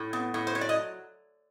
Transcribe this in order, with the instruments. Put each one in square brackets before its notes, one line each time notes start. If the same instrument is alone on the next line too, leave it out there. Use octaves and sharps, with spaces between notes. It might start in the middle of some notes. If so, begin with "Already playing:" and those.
Already playing: [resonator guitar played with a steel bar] A2
B3
A2
C5
F#3 C#5
D5
D#5